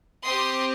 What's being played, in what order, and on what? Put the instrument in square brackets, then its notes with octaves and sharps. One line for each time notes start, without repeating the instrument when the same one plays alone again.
[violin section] C4 G4 C6 D#6